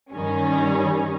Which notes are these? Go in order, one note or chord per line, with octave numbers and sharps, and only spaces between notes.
G2 D#3 G3 C#4